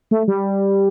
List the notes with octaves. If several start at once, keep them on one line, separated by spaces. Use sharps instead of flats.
A3
G3